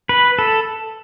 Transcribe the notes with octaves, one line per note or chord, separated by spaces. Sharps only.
B4
A4